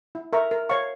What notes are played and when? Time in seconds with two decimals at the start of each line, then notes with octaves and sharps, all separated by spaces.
0.15 E4
0.33 A#4 E5 A#5 C#6
0.51 A#4
0.69 C#5 F5 C#6